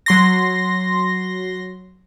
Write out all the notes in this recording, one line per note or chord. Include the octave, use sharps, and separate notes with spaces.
F#3 C6 A#6